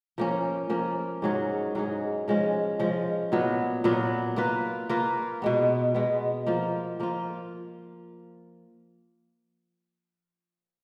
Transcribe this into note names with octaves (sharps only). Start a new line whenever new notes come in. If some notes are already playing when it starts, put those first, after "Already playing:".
F3 A#3 C#4
F3 A#3 C#4
G#2 F#3 C#4 G#4
G#2 F#3 C#4 G#4
F3 G#3 C#4
F3 G#3 C#4
A#2 F#3 B3
A#2 F#3 B3
A#3 F4 B4
A#3 F4 B4
B2 G#3 B3
B2 G#3 B3
F3 A#3 F4
F3 A#3 F4